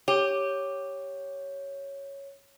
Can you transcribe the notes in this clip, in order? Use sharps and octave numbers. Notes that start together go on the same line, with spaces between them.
G4 C#5